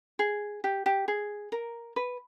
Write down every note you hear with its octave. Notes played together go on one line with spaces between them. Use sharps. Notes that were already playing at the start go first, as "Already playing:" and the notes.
G#4
G4
G4
G#4
A#4
B4